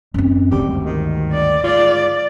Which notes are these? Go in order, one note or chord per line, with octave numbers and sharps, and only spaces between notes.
F#2 C4
G#1 D2 G2 D3 G4
D#3
D5
G#2 F4 D5